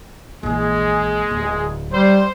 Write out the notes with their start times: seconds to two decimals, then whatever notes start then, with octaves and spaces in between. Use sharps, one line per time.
0.43 A#1 E3 G#3 G#4
1.31 D1
1.91 G3 C5